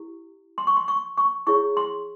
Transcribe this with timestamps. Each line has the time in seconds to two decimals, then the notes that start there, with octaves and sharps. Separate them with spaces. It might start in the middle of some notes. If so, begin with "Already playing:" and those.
Already playing: E4 G4
0.58 C6
0.67 C#6
0.77 C6
0.88 C#6
1.18 C#6
1.47 E4 G#4 C#5 C#6
1.77 C6